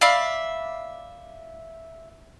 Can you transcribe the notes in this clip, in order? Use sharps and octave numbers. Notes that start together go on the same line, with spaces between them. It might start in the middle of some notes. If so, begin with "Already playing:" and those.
D5 E5 F5 B5